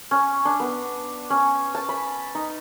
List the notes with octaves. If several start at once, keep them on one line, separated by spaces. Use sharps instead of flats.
C#4
D4
B3
C#4
A5
B5
D#4